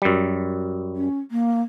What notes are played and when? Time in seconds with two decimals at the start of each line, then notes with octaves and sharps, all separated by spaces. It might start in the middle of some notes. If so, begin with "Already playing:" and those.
0.02 F#2 G3
0.96 C#4
1.31 A#3